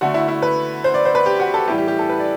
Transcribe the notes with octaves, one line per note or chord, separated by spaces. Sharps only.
D3 A3 F#4
E4
E4
B4
C5
D5
C5
B4
G4
F#4
A4
A2 E3 G3 G4
G4
G4
A4
B4
D5